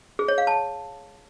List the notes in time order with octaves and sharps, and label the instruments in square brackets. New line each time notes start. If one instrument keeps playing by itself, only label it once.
[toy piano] G#4
C#5
F5
A5